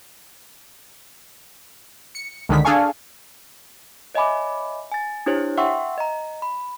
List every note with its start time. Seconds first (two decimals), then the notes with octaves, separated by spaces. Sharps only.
2.15 C#7
2.49 C#2 D3 D#3 B6
2.65 D4 G#4 A4 F5 G#5 C#6
4.15 C#5 D#5 E5 G#5 B5 D6
4.91 G#5 A6
5.26 D4 E4 G4 C5 C#5
5.57 E5 F#5 G5 C6 C#6 E6
5.98 D#5 A#5
6.42 B5